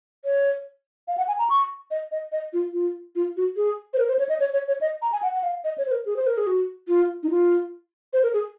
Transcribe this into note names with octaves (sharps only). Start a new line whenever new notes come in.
C#5
F5
F#5
G#5
A#5
C#6
D#5
D#5
D#5
F4
F4
F4
F#4
G#4
C5
A#4
C5
C#5
D#5
C#5
C#5
C#5
D#5
A#5
G#5
F#5
F#5
F5
D#5
C#5
C5
A#4
G#4
C5
A#4
G#4
F#4
F4
D#4
F4
C5
A#4
G#4